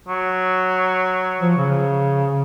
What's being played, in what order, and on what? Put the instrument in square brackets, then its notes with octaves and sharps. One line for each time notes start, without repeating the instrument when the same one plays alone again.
[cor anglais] F#3
[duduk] F3
C#3